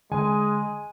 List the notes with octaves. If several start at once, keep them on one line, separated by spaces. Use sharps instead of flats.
D3 G#3 G#5